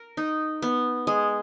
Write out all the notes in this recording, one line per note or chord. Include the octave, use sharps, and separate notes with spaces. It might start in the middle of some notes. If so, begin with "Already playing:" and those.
Already playing: A#4
D#4
B3
G#3